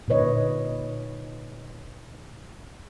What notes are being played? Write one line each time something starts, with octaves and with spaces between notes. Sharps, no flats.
A#2 D3 D#4 B4 C#5 D#5